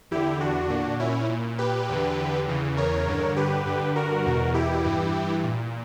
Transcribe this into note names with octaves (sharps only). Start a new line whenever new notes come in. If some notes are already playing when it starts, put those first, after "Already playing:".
E2 D3 E4 G4
D4 F#4
A#2
C#4 E4
A#2
G4 B4
E2 D3
E2 C#3 E3
A#4 C#5
G2 D3
G4 B4
G2 D3
F#4 A#4
E2 B2
E4 G4
G2 E3
A#2